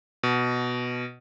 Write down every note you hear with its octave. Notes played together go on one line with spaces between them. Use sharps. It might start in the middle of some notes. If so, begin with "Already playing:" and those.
B2